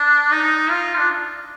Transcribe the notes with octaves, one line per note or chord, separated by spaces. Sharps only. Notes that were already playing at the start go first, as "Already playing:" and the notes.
Already playing: D4
D#4
F4
D4